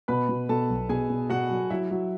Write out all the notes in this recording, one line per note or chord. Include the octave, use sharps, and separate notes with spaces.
B2 B4 B5
B2
B2 A4 A5
B1
B2 G#4 G#5
B2
B2 F#4 F#5
F#3
F#3 E4 E5
F#3